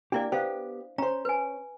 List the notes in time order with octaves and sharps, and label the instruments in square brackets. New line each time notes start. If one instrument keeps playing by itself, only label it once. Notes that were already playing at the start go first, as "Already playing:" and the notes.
[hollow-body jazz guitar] A#3 G4 [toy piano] D4 E4 D5
[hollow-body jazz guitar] B3 G4 [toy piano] C5 F5
[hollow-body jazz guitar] C#4 C5 [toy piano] A#5
[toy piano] B4 G#5